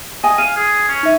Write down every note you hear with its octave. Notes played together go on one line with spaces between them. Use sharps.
D#5 G#5
F5 G#5 D#7
G#4
C#4
D#4 E5